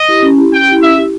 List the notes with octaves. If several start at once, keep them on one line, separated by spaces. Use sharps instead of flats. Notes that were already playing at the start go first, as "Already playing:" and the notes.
Already playing: D#5
E4 G4
C#4
E4 G4
C#4 G5
E4 G4
C#4 E5
E4 G4